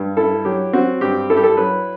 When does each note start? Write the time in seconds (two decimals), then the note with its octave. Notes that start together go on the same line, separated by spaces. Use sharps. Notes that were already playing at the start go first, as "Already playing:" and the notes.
Already playing: G2
0.17 E4 A4
0.45 F#3 G4
0.73 C4 F#4
1.01 G2 G4
1.30 E4 A4
1.37 G4
1.44 A4
1.57 F#3 B4